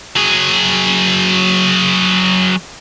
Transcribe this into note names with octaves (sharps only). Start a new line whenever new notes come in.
F#3 G#4